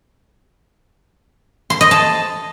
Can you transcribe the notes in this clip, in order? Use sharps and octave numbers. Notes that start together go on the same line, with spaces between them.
C6
D#5
A5